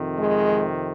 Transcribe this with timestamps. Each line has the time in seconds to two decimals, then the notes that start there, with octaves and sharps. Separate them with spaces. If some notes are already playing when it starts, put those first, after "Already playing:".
Already playing: F2 C3 D#3
0.19 G#3